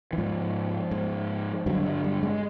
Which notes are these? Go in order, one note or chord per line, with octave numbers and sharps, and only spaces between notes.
E3
G#2 F3
G#2
G2 D3 F#3
G3
G3
G#3